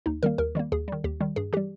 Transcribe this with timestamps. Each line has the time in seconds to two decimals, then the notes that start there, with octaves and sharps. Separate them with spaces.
0.06 D#2 D#4
0.23 D#3 G3 A#3 A#4
0.38 D#2 A#4
0.55 D#3 G3 A#3
0.72 D#2 G#4
0.88 D#3 G3
1.04 D#2 G4
1.21 D#3 G3
1.36 G2 G#4
1.53 E3 G3 G4